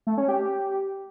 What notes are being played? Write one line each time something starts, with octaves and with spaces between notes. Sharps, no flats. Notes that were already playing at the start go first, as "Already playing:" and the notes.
A3
C#4
G4